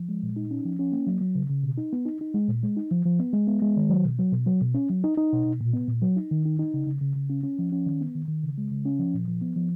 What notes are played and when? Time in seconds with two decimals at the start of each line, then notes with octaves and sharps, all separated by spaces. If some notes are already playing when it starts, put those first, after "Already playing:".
Already playing: F3
0.09 G#3
0.23 A#2
0.36 D#4
0.51 C#4
0.65 F3
0.79 C#4
0.92 A#3
1.07 F#3
1.21 F#3
1.35 C#3
1.50 C#3
1.63 B2
1.78 D#4
1.93 B3
2.06 D#4
2.21 D#4
2.34 G#3
2.49 A#2
2.63 G#3
2.77 D#4
2.91 F3
3.05 F3
3.20 B3
3.33 G#3
3.47 B3
3.62 G#3
3.77 D#3
3.90 F#3
4.05 B2
4.19 F#3
4.32 B2
4.47 F#3
4.62 B2
4.74 C#4
4.90 F#3
5.04 D#4
5.17 D#4
5.32 B2
5.46 B2
5.61 A#2
5.74 B3
5.88 A#2
6.02 F#3
6.17 D#4
6.31 D#3
6.45 D#4
6.59 D#4
6.74 C#3
6.87 C#3
7.01 C#3
7.16 C#3
7.30 C#4
7.44 C#4
7.59 F3
7.72 C#4
7.86 D#3
8.01 B3
8.15 D#3
8.28 D#3
8.44 C#3
8.58 G#3
8.71 C#3
8.85 C#4
8.99 F3
9.14 A#2
9.28 F3
9.42 B3
9.56 F3